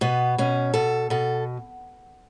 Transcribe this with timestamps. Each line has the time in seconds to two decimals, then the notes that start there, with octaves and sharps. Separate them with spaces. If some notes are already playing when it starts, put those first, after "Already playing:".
0.01 B2 B3
0.38 B2 C#4
0.74 B2 A4
1.10 B2 A4